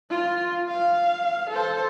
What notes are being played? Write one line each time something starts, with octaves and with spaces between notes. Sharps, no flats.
F4
F5
A4 C5